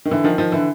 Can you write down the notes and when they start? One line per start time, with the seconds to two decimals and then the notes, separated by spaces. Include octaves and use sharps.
0.05 D#3
0.11 D3 E3
0.24 D#3 F3
0.38 D#3 F3
0.52 D3 E3